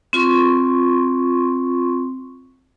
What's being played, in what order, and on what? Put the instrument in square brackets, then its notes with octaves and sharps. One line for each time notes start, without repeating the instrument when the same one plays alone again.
[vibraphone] C4 F4 C6 C#6